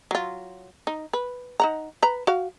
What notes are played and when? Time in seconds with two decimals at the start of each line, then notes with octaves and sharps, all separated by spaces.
0.11 F#3 F4
0.87 D#4
1.13 B4
1.60 D#4 F#5 A#5
2.03 B4 A#5
2.27 F#4 F5